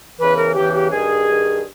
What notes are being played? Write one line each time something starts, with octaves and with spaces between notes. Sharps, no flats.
E2 C#3 E3 B4
A#4
E2 C#3 E3 G4
G4
G2 D#3 G#4
G2 D#3